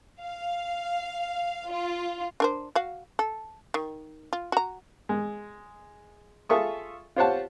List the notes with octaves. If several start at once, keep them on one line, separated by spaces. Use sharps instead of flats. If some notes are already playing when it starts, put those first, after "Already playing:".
F5
F4
D4 A#4 C5
F#4 F5
A4
D#3
F4
F#4 A#5
G#3
F4 G#4 A4 E5 C#6 D#6
F4 G4 C5 C#5 F#5 A5